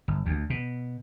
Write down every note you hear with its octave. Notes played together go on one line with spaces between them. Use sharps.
G1
D2
B2